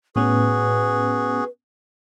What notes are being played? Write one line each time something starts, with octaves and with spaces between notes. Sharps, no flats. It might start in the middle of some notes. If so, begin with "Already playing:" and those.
A2 B3 C#4 F#4 G#4 B4